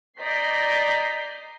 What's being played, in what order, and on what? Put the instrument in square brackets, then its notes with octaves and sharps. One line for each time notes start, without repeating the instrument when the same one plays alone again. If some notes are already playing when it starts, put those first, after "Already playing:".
[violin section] D5 D#5 A#5 G6 B6 C7